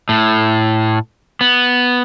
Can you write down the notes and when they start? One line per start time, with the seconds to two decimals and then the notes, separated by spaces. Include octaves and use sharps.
0.09 A2
1.41 B3